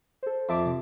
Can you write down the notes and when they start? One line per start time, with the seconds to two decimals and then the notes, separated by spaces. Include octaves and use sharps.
0.23 A4 C5
0.49 F2 E5 A5 D6
0.65 C3